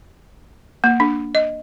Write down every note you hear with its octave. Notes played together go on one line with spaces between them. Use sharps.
A#3
D4
D#5